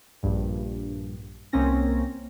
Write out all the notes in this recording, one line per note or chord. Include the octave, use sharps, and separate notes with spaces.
A#1 G2
C2 A#3 C4 C#4 A#6